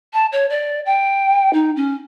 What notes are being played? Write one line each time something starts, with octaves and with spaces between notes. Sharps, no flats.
A5
C#5
D5
G5
D#4
C#4